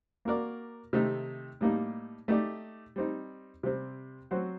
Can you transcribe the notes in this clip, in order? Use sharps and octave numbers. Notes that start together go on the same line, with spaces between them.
A#3 F#4 A#4 D5
C3 D#3 A3 D#4
A2 G3 A#3 D#4
A3 D#4 G4 D5
G3 C4 D#4
C3 G3 C4
F#3 C4 F#4 C5